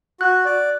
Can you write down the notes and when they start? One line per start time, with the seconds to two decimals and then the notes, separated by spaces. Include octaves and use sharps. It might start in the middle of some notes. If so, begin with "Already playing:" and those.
0.20 F#4 F#6
0.45 D5